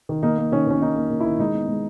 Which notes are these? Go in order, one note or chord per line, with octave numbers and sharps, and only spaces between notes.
D#3
A#3 D#4
A#3
D#3 C#4
D#3 C#4
A#3 D#4
A#3
A#3
E4
D#3
G#3 D#4
B3
G#3